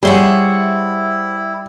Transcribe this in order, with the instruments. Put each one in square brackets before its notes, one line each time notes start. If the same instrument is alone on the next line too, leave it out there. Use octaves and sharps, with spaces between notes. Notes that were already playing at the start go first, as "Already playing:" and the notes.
[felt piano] G3 [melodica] E4 [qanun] G#4 C#5 C6 [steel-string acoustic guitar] C5 E5 F#5